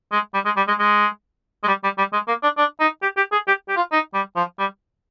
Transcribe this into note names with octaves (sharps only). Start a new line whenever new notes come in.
G#3
G3
G#3
G3
G#3
G#3
G#3
G3
G3
G3
G#3
A#3
D4
D4
D#4
G4
G4
G#4
G4
G4
F4
D#4
G3
F3
G3